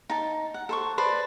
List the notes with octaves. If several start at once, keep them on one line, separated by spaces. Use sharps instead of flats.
D#4 A5
F#5
A4 C5 C#6
B4 C5 D5